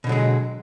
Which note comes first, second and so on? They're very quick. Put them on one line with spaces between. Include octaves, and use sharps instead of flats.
B2 D3 F#3 G#3